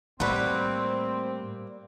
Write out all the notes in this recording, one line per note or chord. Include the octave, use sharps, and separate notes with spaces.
A2 G3 A#3 C4 F#4 B4